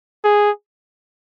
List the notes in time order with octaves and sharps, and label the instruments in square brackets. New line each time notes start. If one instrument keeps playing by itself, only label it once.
[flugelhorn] G#4